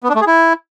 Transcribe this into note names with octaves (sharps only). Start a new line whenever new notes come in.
B3
D4
A3
G#4
E4